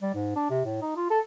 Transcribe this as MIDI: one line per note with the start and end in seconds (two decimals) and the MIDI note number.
0.02 0.12 55
0.15 0.32 44
0.36 0.47 62
0.50 0.60 48
0.65 0.82 45
0.82 0.93 63
0.96 1.07 65
1.10 1.20 69